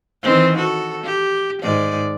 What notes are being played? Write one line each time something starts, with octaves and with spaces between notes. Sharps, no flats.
D#3 E3 C4
F#4 A4
G4
G#2 D#3 D5